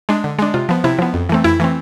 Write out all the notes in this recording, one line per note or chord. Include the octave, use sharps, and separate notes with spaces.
G#3 D4
D3
G#3 D4
C3 F4
F3 B3
C3 E4
F3 B3
F2
E3 A3 C4
F2 E4
E3 A3 C4